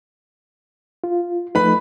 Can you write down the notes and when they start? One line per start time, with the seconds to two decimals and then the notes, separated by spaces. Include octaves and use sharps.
1.04 F4
1.55 F3 A3 D#4 B4 B5